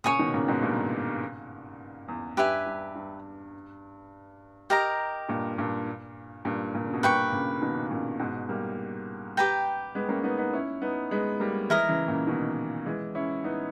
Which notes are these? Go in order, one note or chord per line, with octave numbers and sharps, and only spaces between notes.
A#2 C#3 C#5 G#5 D#6
B2 D#3
A#2 C#3
G#2 B2
G2 A#2
E2
G2 G4 B4 E5 G#5
G2
G2
G4 A#4 D#5 A#5
G2 A#2
G2 A#2
G2 A#2
G2 A#2
C#3
B2
G2 A#2 B4 G5 C#6
A#2 C#3
B2 D#3
A#2 C#3
G#2 B2
G3 A#3
G4 B4 G5 A#5
G#3 B3
A#3 C#4
B3 D#4
B3 D#4
C#4 E4
B3 D#4
G#3 B3
G3 A#3
E3 G#3 E4 A#4 D#5
C#3 E3
A#2 C#3
B2 D#3
E3 G#3
C#4 E4
B3 D#4